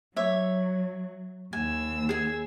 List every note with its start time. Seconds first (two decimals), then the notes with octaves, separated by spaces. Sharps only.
0.16 F#3 C#5 E5
1.53 D#2 G#5 E6
2.09 G#4 G#5